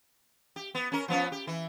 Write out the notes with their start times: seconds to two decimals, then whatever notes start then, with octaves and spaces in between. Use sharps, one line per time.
0.56 G4
0.75 B3
0.92 C#4 A#4
1.08 F3 B3 C#4
1.32 G4
1.47 E3